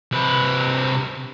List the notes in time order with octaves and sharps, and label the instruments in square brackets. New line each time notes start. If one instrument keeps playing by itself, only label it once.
[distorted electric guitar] C3 B4